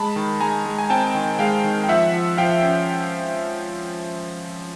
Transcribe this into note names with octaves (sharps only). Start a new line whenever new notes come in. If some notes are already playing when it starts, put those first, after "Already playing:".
Already playing: G#3 A5 B5
D#3
G#3 G#5 A#5
G#3
G#5
C4 G5 A5
D#3
G#3 F5 G5
D#3
G5
F3 E5 F#5
F3
F3 F5 G5
C#4